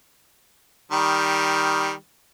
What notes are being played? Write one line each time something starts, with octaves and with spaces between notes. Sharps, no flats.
D#3 G3